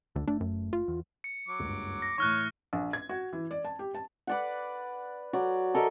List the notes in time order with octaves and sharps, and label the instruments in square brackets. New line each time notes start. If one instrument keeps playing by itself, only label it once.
[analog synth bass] D2 [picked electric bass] D3
[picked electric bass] F#1 A3 [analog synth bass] D4
[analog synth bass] F#2
F4
[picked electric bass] E2
[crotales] C#7
[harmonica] F#3 D6
[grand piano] F#1 C#2 G2
[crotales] A#6
[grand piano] A2 E3 [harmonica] C#5 [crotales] C#6 F6 F#6
[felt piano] A#1
G#6
F#4
E3
D5
A5
G4
A5
[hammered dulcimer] B4 D5 F#5
F#3 D5
A4 A#4 D#5 E5